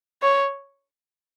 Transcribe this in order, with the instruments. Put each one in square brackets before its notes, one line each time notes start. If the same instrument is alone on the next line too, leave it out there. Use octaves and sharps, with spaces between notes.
[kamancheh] C#5